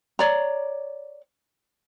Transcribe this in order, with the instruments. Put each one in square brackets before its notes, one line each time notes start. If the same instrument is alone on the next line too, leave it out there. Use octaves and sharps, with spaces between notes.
[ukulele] C#5 D5 A#5